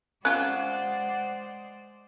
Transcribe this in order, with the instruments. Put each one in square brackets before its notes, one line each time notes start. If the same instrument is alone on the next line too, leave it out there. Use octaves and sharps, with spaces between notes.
[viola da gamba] G#3 C5 D5 [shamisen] C#4 F4 G4 [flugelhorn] F#5 [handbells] F#6